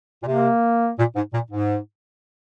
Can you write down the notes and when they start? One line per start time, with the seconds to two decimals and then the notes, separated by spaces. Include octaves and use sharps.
0.23 A#2
0.27 C3 A#3
0.99 A#2
1.16 G#2
1.34 A#2
1.51 G#2